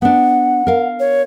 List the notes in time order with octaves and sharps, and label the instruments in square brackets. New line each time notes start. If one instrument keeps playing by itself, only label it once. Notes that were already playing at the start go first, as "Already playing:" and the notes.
[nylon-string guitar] B3 D4 [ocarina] F#5
[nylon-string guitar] A#4 F5
[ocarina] C#5